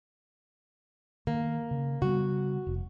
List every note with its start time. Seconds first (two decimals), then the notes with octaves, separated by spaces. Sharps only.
1.27 D#3 A#3
1.71 C#3
2.02 C#3 G3 B3 F#4
2.67 F1